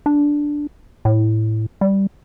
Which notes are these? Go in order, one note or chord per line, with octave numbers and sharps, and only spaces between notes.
D4
A2
G3